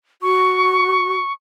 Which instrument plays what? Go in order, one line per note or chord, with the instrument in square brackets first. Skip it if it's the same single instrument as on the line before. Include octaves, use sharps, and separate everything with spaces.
[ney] F#4 [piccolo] C#6